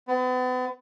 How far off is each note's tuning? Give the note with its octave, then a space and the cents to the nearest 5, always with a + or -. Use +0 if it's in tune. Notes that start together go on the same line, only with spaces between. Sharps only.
B3 +40